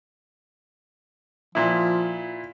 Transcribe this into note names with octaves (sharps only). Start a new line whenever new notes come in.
A#2 F3 E4